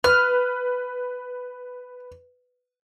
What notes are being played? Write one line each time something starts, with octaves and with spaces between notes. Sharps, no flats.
B4 F6